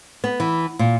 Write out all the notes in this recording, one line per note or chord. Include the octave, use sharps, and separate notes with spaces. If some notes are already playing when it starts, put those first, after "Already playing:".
B3
E3
A#2